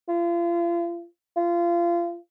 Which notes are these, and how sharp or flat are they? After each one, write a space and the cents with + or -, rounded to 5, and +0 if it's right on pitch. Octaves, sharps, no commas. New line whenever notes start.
F4 -35
F4 -25